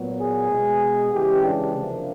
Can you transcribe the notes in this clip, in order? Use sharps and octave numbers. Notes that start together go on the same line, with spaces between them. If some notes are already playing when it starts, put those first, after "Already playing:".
Already playing: A#2 F#3 B3
G#4
B2 G#3 B3
C#3 E3 G#3 G4
D4
C3 F3 A#3